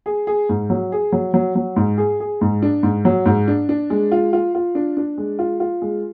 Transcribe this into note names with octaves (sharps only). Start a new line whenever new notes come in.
G#4
G#4
G#2
F#3
G#4
F#3
F#3
F#3
G#2
G#4
G#4
G#2
D4
G#2
F#3
G#2
D4
D4
G#3
F4
F4
F4
D4
D4
G#3
F4
F4
G#3